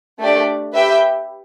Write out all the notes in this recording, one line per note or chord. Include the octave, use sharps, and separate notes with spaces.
A3 D4 G4 D5
G4 B4 E5 G5